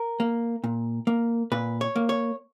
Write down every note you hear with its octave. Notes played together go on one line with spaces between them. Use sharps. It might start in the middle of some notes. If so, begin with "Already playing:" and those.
Already playing: A#4
A#3
A#2
A#3
A#2 B4
C#5
A#3
C#5